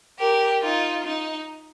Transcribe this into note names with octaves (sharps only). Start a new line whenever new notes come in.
G4 A#4
D#4 F4
D#4